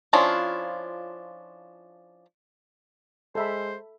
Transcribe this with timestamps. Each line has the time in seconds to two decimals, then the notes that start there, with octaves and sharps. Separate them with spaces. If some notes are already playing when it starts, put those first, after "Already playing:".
0.13 F3 C#4 D4 E4 F4
3.35 G#3 A4 C5 E5 B5